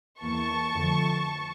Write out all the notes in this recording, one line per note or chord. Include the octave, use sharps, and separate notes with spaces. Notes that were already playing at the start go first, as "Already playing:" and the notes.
E2 E3 A#3 A5 C#6
F2 D3 F3 A3